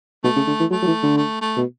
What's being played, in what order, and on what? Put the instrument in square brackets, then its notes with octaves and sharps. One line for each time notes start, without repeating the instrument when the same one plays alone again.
[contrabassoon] B2 [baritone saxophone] A3
[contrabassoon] C#3
D3
E3
[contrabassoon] F#3 [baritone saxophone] A3
[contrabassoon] F#3
E3
D3
[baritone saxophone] A3
A3
[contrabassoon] B2